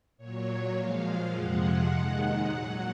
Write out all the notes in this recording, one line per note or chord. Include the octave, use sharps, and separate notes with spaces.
A#2 F#3 C#5
A#2 F3 G#3 F5
F2 C3 F3 G#3 F#5
D#2 D#3 G#3
A#2 F#3